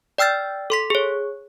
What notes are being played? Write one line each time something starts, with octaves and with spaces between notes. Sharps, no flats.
D5 G5 E6 F6 A6
A4 C6 B6
G#4 C#5